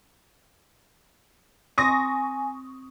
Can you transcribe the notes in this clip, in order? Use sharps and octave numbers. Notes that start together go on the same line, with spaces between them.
C4 G#5 C#6 D#6 A#6